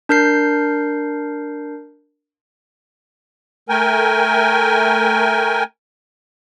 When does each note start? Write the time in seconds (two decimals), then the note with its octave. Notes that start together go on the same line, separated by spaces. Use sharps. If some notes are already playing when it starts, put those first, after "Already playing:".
0.09 D4 A#4 G6 C7
3.69 A3 A#4 G5 G#5